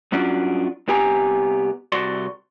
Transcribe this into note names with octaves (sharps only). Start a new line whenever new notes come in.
G2 F#3 C#4 D4 F4 F#4
C2 B3 G4 G#5 A#5
C2 F#4 D5 C6